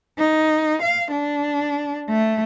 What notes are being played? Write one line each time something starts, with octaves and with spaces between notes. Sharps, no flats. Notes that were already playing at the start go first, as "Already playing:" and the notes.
D#4
F5
D4
A3